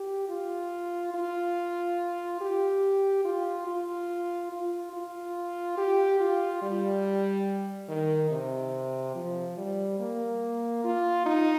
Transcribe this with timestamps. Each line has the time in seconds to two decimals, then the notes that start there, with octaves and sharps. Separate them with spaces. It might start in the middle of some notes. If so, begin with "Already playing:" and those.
Already playing: G4
0.29 F4
1.14 F4
2.41 G4
3.25 F4
3.67 F4
4.52 F4
4.93 F4
5.78 G4
6.20 F4
6.62 G3
7.89 D#3
8.31 C3
9.15 F3
9.57 G3
10.00 A#3
10.84 F4
11.26 D#4